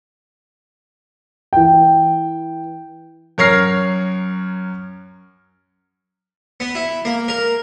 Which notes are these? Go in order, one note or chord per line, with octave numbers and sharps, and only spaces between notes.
E3 G5
F#2 A#4 C#5 F6 A#6 C7
B3
E4
A#3
A#4